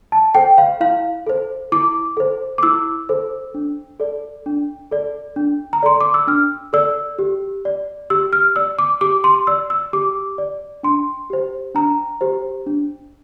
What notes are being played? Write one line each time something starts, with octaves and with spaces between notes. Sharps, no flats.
A5
A4 C5 G5
F5
E4 F5
A4 C5
E4 D6
A4 C5
D6
E4 E6
A4 C5
D4
A4 D5
D4
A4 D5
D4
A#5
A4 D5 C6
D6
E6
D4 F6
A4 D5 E6
G4
D5
G4 E6
F6
D5 E6
D6
G4 D6
C6
D5 E6
E6
G4 D6
D5
D4 C6
G4 C5
D4 A#5
G4 C5
D4